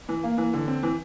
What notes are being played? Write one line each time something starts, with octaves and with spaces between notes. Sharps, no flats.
E3
A#3
E3
D3
C4
E3